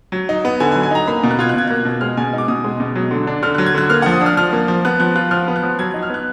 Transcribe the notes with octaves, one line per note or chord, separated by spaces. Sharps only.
F#3
D#4
B3
D3 G#5
G#5
F#3
G#5
D#4 A#5
A#3 B5
B2
F#6
F4 G#6
F#6
B2 G#6
A#3 F#6
B2
G#3 F6
B2 G#5
D#4 D6
B2 D#6
G#3
B2
F#3
D3
D4
D3 F6
F#3 F#6
G#6
D3 F#6
A#3 F6
F3 F#5
D#6
D4 F6
F3 F6
A#3
F3
B3 F#6
F3 F#6
F4 F#6
F3 F6
B3
F#6
F3
F#3 G#6
D#4
F6
B3 F#6